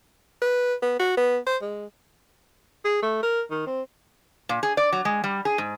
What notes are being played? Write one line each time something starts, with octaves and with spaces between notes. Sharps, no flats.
B4
B3
F#4
B3
C5
G#3
G#4
A3
A#4
D#3
C4
A#2
G#4
D5
F#3
G#3
G3
G#4
G#2